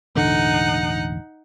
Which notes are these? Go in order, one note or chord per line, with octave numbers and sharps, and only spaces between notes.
E1 A1 D3 D#4 F#5